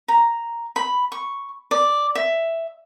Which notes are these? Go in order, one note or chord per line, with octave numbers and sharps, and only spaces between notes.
A#5
B5
C#6
D5
E5